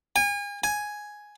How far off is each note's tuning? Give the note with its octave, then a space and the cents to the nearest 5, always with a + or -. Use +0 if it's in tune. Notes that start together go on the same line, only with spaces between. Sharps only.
G#5 -35
G#5 +5